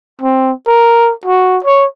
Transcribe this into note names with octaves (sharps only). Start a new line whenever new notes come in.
C4
A#4
F#4
C#5